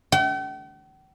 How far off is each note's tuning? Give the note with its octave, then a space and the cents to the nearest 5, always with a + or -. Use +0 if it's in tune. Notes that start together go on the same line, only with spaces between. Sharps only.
G5 -45